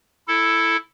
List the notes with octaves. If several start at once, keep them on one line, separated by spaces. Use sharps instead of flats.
E4 A4